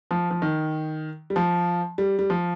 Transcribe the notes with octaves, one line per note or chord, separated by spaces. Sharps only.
F3
F3
D#3
G3
F3
G3
G3
F3